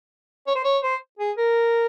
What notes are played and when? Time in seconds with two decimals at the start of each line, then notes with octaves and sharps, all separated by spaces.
0.47 C#5
0.56 C5
0.65 C#5
0.83 C5
1.19 G#4
1.37 A#4